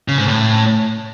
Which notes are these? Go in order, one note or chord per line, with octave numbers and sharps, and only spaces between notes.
C#3
G#2
A2